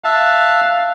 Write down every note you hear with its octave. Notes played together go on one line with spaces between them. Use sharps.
E5 F5 A5 F#6